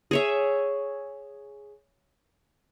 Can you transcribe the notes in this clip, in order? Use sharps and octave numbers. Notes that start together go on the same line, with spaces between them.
G#4 C#5 E5